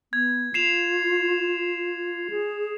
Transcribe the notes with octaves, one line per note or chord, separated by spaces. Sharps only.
B3 G#6
F4 C7 E7 F7
G#4